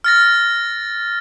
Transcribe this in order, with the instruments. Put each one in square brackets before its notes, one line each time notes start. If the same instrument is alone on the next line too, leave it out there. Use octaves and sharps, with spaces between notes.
[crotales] F6 A6 A#6